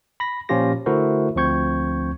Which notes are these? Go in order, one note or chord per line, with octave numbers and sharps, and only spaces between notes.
B5 A#6
A#2 F3 C#4 F4 G4 A#6
D3 A3 E4 F#4 A#4 C5
D2 F3 C4 C#6 G6 G#6